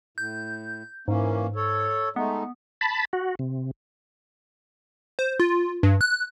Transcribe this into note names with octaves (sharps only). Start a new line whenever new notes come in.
A2 G6
G#2 E3 A#3 C#4
A4 C#5
G#3 A3 B3 D#4
A5 B5
F#4
C3
C5
F4
G2
F#6